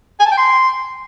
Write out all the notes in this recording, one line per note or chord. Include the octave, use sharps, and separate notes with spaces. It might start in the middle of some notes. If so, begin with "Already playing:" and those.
G#5
A5
G5
C6